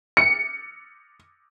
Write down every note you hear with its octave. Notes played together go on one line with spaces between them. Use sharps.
C#7